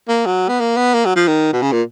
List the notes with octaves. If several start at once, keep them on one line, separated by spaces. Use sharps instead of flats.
A#3
F#3
B3
A#3
B3
A#3
F#3
F3
D#3
B2
C#3
A#2